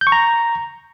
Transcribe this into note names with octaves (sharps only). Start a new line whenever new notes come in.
G6
C#6
A#5